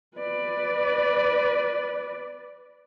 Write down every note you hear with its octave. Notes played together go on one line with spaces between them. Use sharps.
B4 D5